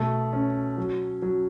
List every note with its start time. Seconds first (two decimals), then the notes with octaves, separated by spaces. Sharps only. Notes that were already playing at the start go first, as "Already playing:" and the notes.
Already playing: B2 A3
0.33 C#4
0.78 F#3
1.22 F#3